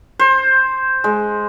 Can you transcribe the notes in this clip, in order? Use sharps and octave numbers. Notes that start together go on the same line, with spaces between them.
C5
G#3